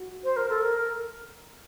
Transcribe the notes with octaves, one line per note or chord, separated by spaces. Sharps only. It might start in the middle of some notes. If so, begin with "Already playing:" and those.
Already playing: F#4
C5
A#4
A4
A#4